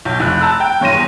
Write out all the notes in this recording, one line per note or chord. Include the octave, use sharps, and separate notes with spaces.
B1 G6
F1 F#6
A5 A#5 E6
G5
G2 C#5 C6 A#6 D#7
E2